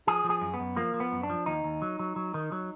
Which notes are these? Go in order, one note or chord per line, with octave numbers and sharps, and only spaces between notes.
F3 G#4
F3
G#4
F#2
B3
F#2
F3 A#3
F3
B3
F#2
D4
F3
D#2 D#4
D#2
F#3
F#3
F#3
D#3
F#3